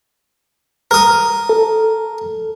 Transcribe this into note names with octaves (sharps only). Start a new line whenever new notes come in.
A#4 D#6
A4